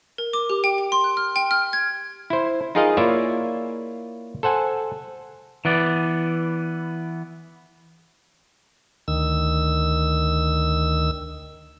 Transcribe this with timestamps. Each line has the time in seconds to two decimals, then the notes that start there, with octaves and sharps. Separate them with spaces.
0.18 A#4
0.33 D6
0.50 G4
0.64 G5
0.78 G5
0.92 C6
1.04 F#6
1.17 F6
1.36 G5
1.51 F6
1.73 G#6
2.30 E4 C5
2.75 D#4 F4 G#4 A#4 D#5 F5
2.97 A#3 E4 F4 C#5 D5 E5
4.43 A4 C5 F#5 G#5
5.65 E3 B3 D5
9.08 D2 D#3 E6